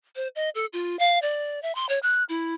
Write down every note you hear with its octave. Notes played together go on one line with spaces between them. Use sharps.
C5
D#5
A4
F4
F5
D5
E5
C6
C#5
F#6
E4